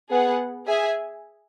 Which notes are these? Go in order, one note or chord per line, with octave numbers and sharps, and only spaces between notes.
B3 G#4 B4 F#5
G#4 E5 G#5